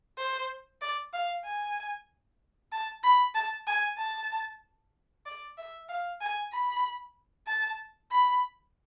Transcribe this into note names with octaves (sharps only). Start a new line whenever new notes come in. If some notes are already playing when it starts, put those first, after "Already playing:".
C5
D5
F5
G#5
A5
B5
A5
G#5
A5
D5
E5
F5
G#5
B5
A5
B5